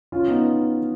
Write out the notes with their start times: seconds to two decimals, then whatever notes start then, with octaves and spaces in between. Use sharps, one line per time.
0.12 C#4 F4
0.28 B3 D#4